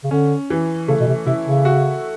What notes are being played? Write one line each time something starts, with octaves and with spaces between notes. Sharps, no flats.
C#3
D3 C#4
E3
C#3 A3
B2
C3
C3 E4
C#3
F#4